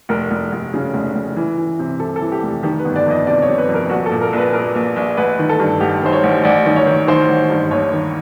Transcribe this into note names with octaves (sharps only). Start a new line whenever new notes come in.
F1 A#4
F1
F1
C#3
F1
F1
E3
E3
C3
C3 A4
A4
E3
G4
F1
D#3 G4
B4
G1
D5
F2 D#5
C3 D5
C#5
C3
B4
F2
A#4
A#1 F#4
A4
A#2
A#4
A#1 B4
A#1 A#4
A#1
A#1
A1 B4
D#3
A4
G2
A1 G4
D#3 C5
C#5
A1
A1 D5
D#3
C#5
D#3
D#3 C5
A1
G2
D#2 C#5
D#3